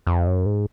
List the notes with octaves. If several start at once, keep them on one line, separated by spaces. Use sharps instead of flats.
F2
F#2
G#2